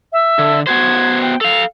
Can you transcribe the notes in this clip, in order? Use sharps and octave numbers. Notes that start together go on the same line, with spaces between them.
E5
D3
B3 F#4 C5 G#6
G5
A4 F5 F7